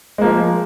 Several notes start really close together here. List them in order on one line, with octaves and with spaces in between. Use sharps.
G#3 A#3 F3